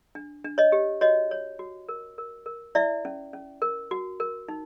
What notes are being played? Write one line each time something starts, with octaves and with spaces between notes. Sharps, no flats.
D4
D4
C#5 D#5
G4
F#4 C#5 D#5
C#5
F#4
A#4
A#4
A#4
E4 D5 E5
C#4
C#4
A#4
F#4
A#4
D#4